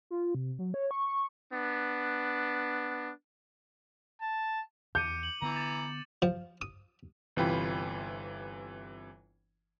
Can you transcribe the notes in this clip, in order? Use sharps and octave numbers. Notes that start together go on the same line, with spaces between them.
F4
C3
F#3
C#5
C#6
C#6
B3 D4
A5
E2 D6 G6 C#7 D#7
F#7
D3 E3 B3 A#5
A6 E7
F3
D#6
G1 C3 E3 F4 G5 B5